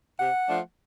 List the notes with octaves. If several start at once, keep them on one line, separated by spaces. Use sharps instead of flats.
C3 F#5
F3 A3 D4